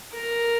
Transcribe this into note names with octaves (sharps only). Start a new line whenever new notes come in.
A#4